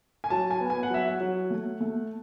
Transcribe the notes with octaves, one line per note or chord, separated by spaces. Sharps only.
G#5
F#3 A5
G#5
B3
G#5
F#5
F#3 E5
F#5
F#3
A3
A3